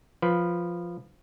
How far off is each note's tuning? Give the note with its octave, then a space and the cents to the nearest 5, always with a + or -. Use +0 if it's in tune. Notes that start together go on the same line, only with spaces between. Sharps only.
F3 +0 B4 +0